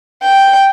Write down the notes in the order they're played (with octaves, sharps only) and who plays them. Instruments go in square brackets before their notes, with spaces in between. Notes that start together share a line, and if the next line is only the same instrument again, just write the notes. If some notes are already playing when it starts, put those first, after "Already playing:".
[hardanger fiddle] G5